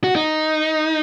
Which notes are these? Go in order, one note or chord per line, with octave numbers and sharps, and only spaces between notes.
F#4
D#4